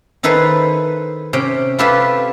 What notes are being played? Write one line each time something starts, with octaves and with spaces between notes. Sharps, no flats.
D#3 D#4 E4 A4 B4 C5
C3 C#4 G5
E4 F4 G4 A4 B4 E5